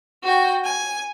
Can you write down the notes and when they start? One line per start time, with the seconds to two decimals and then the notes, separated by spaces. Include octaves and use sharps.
0.23 F#4 G5
0.63 G#5